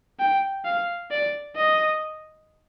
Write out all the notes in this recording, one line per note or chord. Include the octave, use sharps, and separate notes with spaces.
G5
F5
D5
D#5